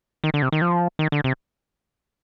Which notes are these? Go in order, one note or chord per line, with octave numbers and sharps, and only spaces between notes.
D#3
D3
C3
D#3
F3
D#3
D3
C3